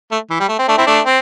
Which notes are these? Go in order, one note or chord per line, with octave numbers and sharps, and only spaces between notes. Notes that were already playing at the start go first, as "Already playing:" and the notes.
A3
E3
G3
A3
C4
A3 D4
C4 E4
A3 D4
C4